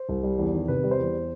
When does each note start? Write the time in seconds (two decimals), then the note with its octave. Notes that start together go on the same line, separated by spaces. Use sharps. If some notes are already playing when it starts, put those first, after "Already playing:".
Already playing: C5
0.09 C2
0.23 G3
0.38 E2
0.53 D#3
0.68 C3 B4
0.83 G3
0.91 C5
0.99 E2